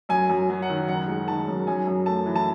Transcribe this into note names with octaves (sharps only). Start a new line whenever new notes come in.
F#2 G#5
F#2
F#3
F#5
D#3
F#1 F#5
G#3
D#3 A5
F#2
F#2 G#5
F#2
A3 A5
E3
A5